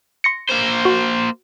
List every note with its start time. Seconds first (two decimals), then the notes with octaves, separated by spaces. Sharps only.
0.24 C6 A#6 C#7
0.50 A#3 C5
0.85 F#4